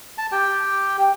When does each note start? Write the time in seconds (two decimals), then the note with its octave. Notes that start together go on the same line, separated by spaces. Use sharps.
0.18 A5
0.32 G4 G5
0.99 G5